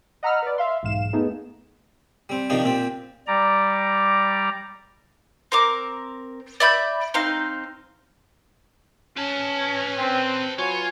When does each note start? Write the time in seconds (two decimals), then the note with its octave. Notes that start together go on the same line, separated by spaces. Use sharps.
0.23 D#5 F#5 A#5 B5 E6 F6
0.42 B4 D5
0.58 E5 F5 C6
0.83 B1 E2 G#2 F5 E7
1.13 A3 B3 D#4 G#4
2.29 G3 C4
2.50 C3 D#3 F3 D4 D#4
2.64 A#2 C4 G4
3.27 G3 D5 A#5
5.52 C4 A#4 D6
6.60 D5 E5 B5 G6
7.14 C4 D#4 F5
9.17 C#4 B4 A5
9.98 C4
10.59 F#3 F4 B4 C#5 G#5